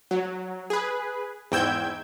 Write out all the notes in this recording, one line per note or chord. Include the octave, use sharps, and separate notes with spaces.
F#3
G#4 B4
E2 G#2 G5 E6 G6 G#6